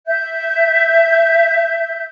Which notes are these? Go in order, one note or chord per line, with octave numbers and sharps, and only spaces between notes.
E5 G6